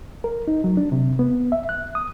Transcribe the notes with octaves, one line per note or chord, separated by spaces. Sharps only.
A#4
D#4
F#3
D4
C3
B3
E5
F#6
D#6